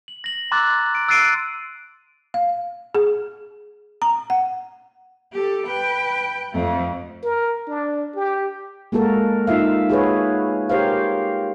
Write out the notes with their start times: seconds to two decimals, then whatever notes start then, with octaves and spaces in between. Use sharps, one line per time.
0.08 F#7
0.24 A#6 F#7
0.51 A#5 C6 D6 E6 F#6 A6
0.95 D7
1.08 E6 F#6 A6 C7 D7 D#7
2.34 F5
2.95 G#4
4.02 A#5
4.30 F#5
5.33 G4 A4
5.66 B4 G5
6.53 F2 A3
7.23 A#4
7.68 D4
8.15 G4
8.92 G#3 A#3 F#4 A4 A#4
9.47 D#4 F4 E5 F5
9.89 F#4 G#4 B4 C#5
10.70 G4 A#4 C5 C#5 F5